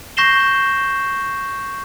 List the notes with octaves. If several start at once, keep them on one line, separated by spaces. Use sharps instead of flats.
C#6 G6 A#6 C7 E7 G7